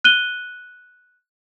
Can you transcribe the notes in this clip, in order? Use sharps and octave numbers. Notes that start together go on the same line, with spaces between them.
F#6 D#7 G7